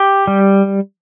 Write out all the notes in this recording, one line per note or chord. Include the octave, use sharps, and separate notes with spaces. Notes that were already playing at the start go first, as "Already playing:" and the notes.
Already playing: G4
G3